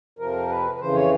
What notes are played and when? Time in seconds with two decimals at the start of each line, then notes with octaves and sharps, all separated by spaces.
0.19 F2 C3 F3 A#4
0.49 B4
0.75 B4
0.79 F2 C#3 E3 C5
0.94 C#5